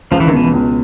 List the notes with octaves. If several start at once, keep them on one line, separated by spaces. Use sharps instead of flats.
C#2 F3
E3
D#3
B2 E3
C#2